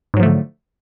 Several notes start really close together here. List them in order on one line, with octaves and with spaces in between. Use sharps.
G#2 F#3 F3 A3 D3